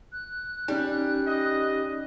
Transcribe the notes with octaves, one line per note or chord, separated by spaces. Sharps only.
F#6
G3 C#4 D#4
D#5